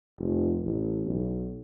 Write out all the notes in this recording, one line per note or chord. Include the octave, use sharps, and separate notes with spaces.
F1
A1
B1